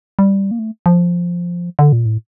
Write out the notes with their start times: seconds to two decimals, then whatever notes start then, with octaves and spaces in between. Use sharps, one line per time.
0.19 G3
0.51 A#3
0.59 A3
0.86 F3
1.79 D3
1.93 A#2
2.06 A2